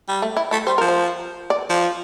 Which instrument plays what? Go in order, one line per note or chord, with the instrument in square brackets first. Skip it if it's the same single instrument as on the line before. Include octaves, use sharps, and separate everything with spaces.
[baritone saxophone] G3
[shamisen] A3
E4
[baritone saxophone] A3 [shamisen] E4
[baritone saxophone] G3 [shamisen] C5
[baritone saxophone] F3 [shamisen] A#4
[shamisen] C5
D5
[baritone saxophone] F3